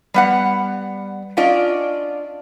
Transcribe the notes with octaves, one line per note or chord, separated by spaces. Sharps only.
G3 B3 F#5
C#4 D4 F4 D5 D#5